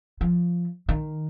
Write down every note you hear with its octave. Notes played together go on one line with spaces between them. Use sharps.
F3
D#3